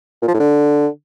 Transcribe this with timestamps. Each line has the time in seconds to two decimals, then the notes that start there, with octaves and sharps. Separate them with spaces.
0.22 A#2
0.28 F3
0.34 A2
0.40 D3